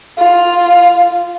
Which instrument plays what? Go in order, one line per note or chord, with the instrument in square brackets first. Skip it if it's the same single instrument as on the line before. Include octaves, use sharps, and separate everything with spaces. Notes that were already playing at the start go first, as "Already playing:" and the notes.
[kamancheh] F4